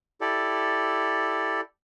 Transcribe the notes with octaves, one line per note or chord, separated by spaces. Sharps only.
E4 G4 A4 D5